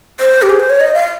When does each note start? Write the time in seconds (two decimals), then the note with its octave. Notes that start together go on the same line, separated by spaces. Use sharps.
0.20 C5
0.42 G4
0.50 G#4
0.60 C5
0.70 C#5
0.80 D#5
0.94 F5